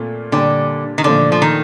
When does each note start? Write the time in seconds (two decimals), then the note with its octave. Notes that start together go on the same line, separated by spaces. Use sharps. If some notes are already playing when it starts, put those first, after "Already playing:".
Already playing: A#2 A3 C4 F4
0.32 A#2 D3 G3 D4 G4
0.98 D#3
1.04 A#2 D3 F3 A3 D4
1.32 F3
1.42 D#3